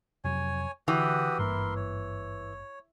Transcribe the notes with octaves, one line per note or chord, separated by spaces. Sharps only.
F2 C3 F#3 C#5 G#5
D3 E3 F#4 G4 D#6
G#1 G2 A#3 E4 A#4 C6
C#5